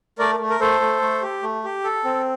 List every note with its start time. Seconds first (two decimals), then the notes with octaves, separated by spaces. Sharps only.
0.19 A3 A#4 D5
0.40 A3
0.50 A#4
0.60 A3 A4 C5
0.81 A3
1.02 A3
1.22 G4
1.43 A3
1.64 G4
1.84 A4
2.05 C4